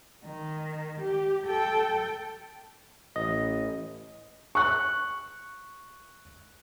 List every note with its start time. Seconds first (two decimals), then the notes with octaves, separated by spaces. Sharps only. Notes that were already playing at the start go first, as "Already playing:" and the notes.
0.25 D#3
1.01 G4
1.47 A4 G5
3.16 A1 D#5
4.55 C#6 F#6